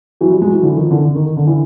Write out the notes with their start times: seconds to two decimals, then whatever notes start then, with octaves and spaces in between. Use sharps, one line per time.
0.21 E3 F#3
0.31 F3 G3
0.42 F#3 G#3
0.52 E3 F#3
0.63 D3 E3
0.77 D#3 F3
0.91 D3 E3
1.05 D3
1.15 D#3
1.26 D#3
1.37 D3
1.47 D3 E3